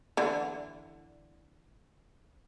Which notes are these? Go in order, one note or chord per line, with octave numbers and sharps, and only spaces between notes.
D3 E3 D4